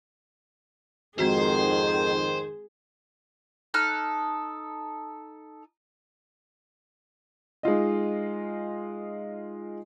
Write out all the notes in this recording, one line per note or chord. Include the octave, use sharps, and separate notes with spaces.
F2 G#2 D#3 G#3 C4 F#4 G#4 C5
D#4 A4 F6 F#6
G#3 D#4 F4 D#5